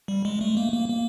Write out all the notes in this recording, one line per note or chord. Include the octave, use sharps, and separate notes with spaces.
G3
G#3
A3
A#3
A#3
A#3